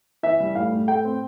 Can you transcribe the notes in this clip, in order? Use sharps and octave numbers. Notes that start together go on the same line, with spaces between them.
E3 E5
G3
A2 F5
A2
A3 G5
C4